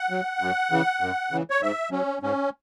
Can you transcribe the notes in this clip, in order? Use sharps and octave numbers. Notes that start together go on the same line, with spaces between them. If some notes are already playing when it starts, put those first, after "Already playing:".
Already playing: F#5
F#3
F#2
C#3 E3
F#2
C#3 E3
C#5
G#2 E5
F#3 C#4
G#2 C#4